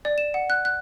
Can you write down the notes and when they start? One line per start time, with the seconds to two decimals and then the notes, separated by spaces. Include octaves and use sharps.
0.05 D5
0.18 E7
0.34 F#5
0.50 F#6
0.65 F#6